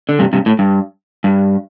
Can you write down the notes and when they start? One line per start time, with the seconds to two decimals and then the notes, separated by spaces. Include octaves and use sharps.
0.09 D3
0.19 G2 C3
0.33 G2 C3
0.46 A2
0.59 G2
1.24 G2